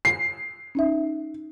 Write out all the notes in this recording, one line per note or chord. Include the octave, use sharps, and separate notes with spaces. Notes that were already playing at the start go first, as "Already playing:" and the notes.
C7
C#4 D#4 E5